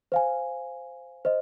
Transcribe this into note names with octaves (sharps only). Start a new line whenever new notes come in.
C5 F5 G#5
C5 D#5